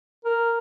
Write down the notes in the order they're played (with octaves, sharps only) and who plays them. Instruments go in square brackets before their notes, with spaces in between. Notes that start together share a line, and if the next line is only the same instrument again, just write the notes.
[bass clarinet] A#4